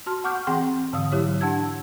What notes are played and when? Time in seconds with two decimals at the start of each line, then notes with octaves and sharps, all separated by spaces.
0.06 F#4 A5 C6 F6
0.24 F#5 C#6 D6 F6 G6
0.47 E3 C4 G#4 F#5 G5 C6
0.93 G#2 D3 E3 F5 D#6 E6
1.12 F#3 E4 G4 C#5
1.41 D4 F#5 A5 E6 G#6